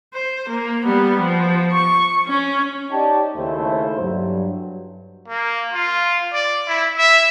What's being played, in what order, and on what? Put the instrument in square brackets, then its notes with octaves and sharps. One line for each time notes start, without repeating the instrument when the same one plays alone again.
[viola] C5
A#3
G3 B3
F3
C#6
C#4
[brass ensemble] D#4 G4 C#5 D5 G5 A5
D#2 C#3 A3 E4 A4 C5
G2 F#3
[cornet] A#3
F4
D5
E4
E5